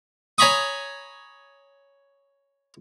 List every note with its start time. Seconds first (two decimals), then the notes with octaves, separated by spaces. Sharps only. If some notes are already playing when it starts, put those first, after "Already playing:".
0.38 C#5 G#5 A#5 B5 C#6 D#6